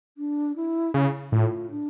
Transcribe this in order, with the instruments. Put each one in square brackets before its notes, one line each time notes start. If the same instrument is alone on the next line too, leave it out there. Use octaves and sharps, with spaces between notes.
[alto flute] D4
E4
[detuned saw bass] C#3
[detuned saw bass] A2 [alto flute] F4
[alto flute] D4